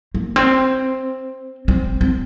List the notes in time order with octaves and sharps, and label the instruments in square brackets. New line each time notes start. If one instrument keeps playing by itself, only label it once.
[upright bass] A#3
C4
C4
C4